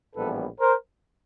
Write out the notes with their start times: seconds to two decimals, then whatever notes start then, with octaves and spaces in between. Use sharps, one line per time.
0.16 A#1 A2 E3 G3 B3 A4 B4
0.60 A#4 C5